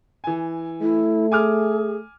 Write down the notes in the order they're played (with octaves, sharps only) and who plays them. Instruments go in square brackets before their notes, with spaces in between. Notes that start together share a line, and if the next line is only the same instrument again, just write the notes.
[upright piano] E3 G#5
[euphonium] A3 [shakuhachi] E4
[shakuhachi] G#4 [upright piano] G#5 D6 F6